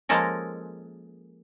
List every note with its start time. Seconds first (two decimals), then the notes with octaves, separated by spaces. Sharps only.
0.09 F3 G#3 A#3 C#4 A4 A#4